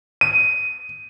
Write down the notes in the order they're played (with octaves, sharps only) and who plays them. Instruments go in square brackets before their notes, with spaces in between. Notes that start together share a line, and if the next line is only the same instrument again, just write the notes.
[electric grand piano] D#7